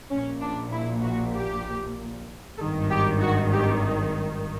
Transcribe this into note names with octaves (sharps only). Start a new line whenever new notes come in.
A#1 A#2 C#4
D4
E4
F#4
G4
G#1 G2 D#3 A4
G4
F#4
G4